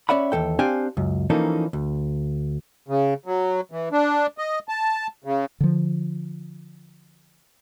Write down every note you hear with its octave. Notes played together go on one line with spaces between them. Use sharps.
C#4 D5 E5 F#5 B5
D#2 E3 A4 G5
C4 D4 G4 F5 G5 G#5
C#2 F#2
E3 F3 A#3 C#4 D#4 A4
D2
C#3
F#3
E3
D4
D#5
A5
C#3
D3 F3